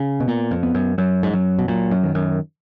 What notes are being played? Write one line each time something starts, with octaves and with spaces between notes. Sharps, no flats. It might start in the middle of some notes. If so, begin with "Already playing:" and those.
Already playing: C#3
B2
A#2 B3
F2
B3
F#2
F#2 F#3
G#2
F#2 F#3
B2
A#2 F#3
F#2
D#3
F#2